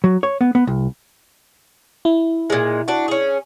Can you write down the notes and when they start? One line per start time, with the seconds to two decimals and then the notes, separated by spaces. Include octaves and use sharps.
0.04 F#3
0.23 C#5
0.41 B3
0.55 B3
0.67 C2
2.05 E4
2.50 A#2 G#3
2.88 D4 F#4
3.08 C#4 G#4